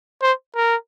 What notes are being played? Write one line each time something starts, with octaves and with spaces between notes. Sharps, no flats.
C5
A#4